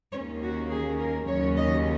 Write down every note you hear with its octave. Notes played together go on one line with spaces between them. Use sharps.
D#2 D#3 A#3 C#4 C#5
F#4
G#4
A#4
D#2 C#3 F#3 C#4 C#5
D#5